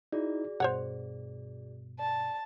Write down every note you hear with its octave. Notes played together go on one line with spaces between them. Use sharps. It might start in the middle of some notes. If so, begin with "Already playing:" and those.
D#4 E4 F#4 G#4 D5
G2 B2 C5 C#5 F#5
D5 A5